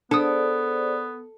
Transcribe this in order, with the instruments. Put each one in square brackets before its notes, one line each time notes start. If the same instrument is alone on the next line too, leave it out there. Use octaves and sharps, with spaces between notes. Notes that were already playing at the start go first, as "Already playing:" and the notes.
[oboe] B3 [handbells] D4 D#6 [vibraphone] G#4 C5 D5 [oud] A4